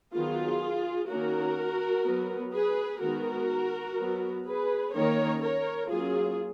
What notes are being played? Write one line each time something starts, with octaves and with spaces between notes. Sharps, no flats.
D#3 F#3 B3 F4 G#4
D#3 A#3 C#4 F#4 A#4
F#3 B3
G#4 B4
D#3 G#3 B3 F#4 A#4
F#3 B3
G#4 B4
D#3 A#3 C#4 A#4 C#5
A#4 C#5
F#3 A#3 C#4 F4 G#4